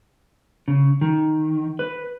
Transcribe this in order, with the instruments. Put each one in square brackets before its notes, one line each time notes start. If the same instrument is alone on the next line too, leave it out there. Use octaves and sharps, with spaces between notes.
[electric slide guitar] C#3
D#3
B4